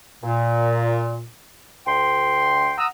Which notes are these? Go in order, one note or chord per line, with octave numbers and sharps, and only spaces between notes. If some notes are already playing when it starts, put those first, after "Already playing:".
A#2
D2 G5 C6
F#5 A#5 D#6 E6